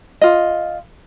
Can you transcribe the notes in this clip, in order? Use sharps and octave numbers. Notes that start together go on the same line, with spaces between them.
F4 D#5